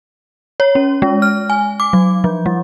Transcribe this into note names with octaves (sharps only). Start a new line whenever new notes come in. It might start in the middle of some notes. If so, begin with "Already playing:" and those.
C#5
C#4
G#3
F6
G#5
D6
F#3
F3
G3